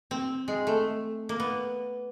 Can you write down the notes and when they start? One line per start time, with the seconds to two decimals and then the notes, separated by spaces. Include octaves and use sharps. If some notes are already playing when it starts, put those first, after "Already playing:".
0.11 C4
0.48 G#3
0.67 A3
1.29 A#3
1.40 B3